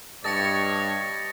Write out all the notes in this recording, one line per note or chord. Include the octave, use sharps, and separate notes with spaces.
G2 G4 C#5 D#5 A5 A6 A#6 C#7